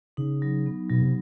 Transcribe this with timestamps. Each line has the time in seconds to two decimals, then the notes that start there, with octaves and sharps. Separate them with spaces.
0.17 C#3 D#4
0.42 F#3
0.66 B3
0.90 B2 F#3
1.02 C3